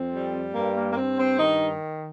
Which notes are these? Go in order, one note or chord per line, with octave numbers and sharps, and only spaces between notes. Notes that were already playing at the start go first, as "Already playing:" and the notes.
Already playing: F2 C4
G3
G2 A#3
A#3
A#3
G2 C4
C4
D#3 D#4